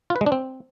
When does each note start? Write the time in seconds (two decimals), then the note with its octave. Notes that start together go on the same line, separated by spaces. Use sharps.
0.10 F4
0.16 B4
0.21 G#3
0.26 D4
0.32 C4